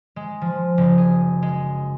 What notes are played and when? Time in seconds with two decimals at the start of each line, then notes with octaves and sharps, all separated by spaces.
0.16 G#3
0.41 F3
0.78 F#1
0.98 G#4
1.43 G#3